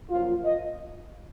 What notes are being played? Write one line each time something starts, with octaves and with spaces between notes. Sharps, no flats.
F#2 F3 A#3 F4
D#5